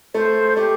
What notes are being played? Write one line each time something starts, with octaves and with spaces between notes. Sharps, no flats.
A3 C5
A3 G4